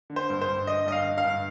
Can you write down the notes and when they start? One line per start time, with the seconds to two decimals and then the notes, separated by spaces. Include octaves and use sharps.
0.10 D3
0.16 C5
0.30 G2
0.41 C5
0.48 G2
0.67 D3 D#5
0.86 G2 D#5
0.92 F5
1.04 D3
1.18 F5
1.24 G2